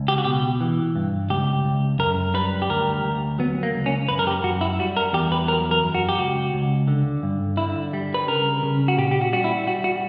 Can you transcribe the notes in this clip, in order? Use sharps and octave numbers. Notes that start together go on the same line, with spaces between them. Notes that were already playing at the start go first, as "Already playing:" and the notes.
Already playing: C#2
G4
F#4
B2 G4
E3
G2
C#2 G4
C#2
F#2 A#4
G3 B4
G4
D2 A#4
D2
F#3 B3
A#3
C#2
C#4
F#2 B4
A#4
G4
F#2 F#4
E4
G3 F#4
A#4
E2 G4
B4
F#3 A#4
A#4
F#2
F#4
G4
C#2 F#4
C#2
D3
G2
D3 E4
G3
B4
C#3 A#4
C#3
F#4
A#2 G4
G4
F#4
G3 F#4
E4
G3 F#4
F#4